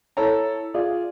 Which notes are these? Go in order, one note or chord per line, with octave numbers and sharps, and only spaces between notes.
E4 A4 C#5 A#5
F4 G#4 D5